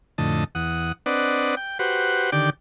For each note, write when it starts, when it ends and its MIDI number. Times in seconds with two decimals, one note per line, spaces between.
0.18 0.44 41
0.18 0.44 45
0.18 0.44 50
0.18 0.44 75
0.18 0.44 81
0.55 0.92 40
0.55 0.92 78
0.55 0.92 87
1.06 1.55 60
1.06 1.55 62
1.06 1.55 71
1.06 1.55 74
1.06 1.55 75
1.06 1.55 78
1.57 1.78 79
1.79 2.30 66
1.79 2.30 67
1.79 2.30 71
1.79 2.30 72
1.79 2.30 78
2.32 2.50 50
2.32 2.50 51
2.32 2.50 67
2.32 2.50 74
2.32 2.50 79
2.32 2.50 86